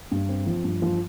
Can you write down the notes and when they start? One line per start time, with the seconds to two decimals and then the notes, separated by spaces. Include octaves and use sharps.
0.11 G2
0.29 C4
0.46 F3
0.64 G2
0.82 F3